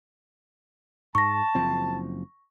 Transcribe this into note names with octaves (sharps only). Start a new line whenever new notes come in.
G#2 A5 C#6 A#6
F#1 F3 C4